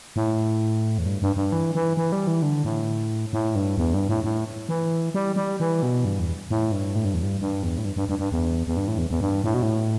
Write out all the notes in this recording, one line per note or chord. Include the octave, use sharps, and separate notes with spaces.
A2
E2
G2
G2
G2
E3
E3
E3
G3
E3
D3
A2
A2
G2
E2
G2
A2
A2
E3
G3
G3
E3
B2
G2
E2
A2
G2
A2
G2
E2
G2
G2
E2
A2
G2
G2
G2
G2
E2
E2
G2
A2
E2
E2
G2
A2
B2
A2